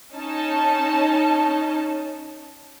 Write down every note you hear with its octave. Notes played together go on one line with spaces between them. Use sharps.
C#4 D#4 A5